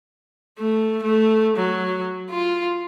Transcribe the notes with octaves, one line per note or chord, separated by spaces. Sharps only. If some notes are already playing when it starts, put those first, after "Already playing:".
A3
A3
F#3
F4